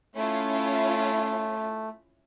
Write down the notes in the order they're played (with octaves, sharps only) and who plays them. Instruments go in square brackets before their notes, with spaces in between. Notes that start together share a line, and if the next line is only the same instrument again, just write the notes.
[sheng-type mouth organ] A3 [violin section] C#4 E4 F4